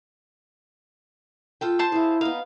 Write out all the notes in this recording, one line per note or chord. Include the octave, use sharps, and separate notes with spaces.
F4 A4 G5
C5 A5 C6
E4 G#4 F5
B3 D#4 F5